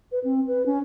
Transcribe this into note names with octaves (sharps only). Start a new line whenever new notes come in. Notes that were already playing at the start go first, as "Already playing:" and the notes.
B4
C4
B4
C#4